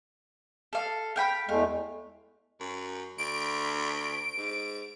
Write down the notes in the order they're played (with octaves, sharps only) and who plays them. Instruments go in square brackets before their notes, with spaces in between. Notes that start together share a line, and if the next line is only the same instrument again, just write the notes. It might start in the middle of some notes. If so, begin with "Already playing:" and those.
[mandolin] A4 F5
F5 G5 B5
[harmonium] E2 G#3 A3 [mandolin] F5
[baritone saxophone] F#2
[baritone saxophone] D2 [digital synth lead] D7
[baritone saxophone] G#2